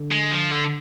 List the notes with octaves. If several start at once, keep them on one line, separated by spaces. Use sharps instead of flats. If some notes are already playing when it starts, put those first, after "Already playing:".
Already playing: D3
G#3
F3
D3